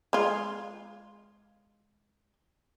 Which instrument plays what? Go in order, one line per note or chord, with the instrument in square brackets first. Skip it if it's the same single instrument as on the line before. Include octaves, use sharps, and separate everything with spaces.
[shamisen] G#3 F4